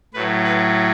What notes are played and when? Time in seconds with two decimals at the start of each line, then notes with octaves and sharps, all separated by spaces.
0.14 A2 F#3 B4
0.44 B4